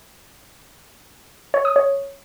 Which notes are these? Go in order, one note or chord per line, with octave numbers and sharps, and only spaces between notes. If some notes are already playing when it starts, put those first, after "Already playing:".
C#5
D#6
C#5